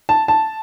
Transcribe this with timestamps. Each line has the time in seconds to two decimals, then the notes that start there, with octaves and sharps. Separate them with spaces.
0.09 A5
0.28 A5